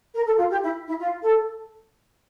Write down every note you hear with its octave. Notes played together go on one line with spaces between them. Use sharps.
A#4
A4
F4
G4
E4
E4
F4
A4